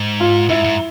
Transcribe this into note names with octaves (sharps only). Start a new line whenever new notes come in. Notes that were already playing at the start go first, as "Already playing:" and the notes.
Already playing: G#2
F4
G#2 E4
G#2